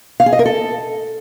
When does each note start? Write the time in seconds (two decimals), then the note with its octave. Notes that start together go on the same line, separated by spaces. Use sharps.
0.20 F5
0.26 G#4
0.33 D#5
0.39 A#4
0.45 A4